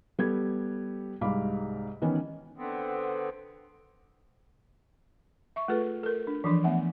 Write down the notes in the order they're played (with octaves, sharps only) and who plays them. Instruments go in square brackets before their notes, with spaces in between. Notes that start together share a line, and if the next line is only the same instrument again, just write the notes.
[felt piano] G3 B3 G4 A4 G#6
C2 G#2 F5 B5 D6
D#3 E3 B3 C#4
[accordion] D3 B3 C4
[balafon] E5 C#6
A3 F4 G#4 A4 B4
A4 A#4
D4
E3 F3 D4 C6
A3 B3 E5 F#5